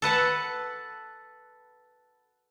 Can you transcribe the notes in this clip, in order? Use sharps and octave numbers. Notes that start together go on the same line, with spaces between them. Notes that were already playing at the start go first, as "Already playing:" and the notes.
A4 B4 F#5 A5